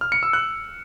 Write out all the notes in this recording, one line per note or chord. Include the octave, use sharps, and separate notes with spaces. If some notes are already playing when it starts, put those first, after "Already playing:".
F6
C#7
E6
F#6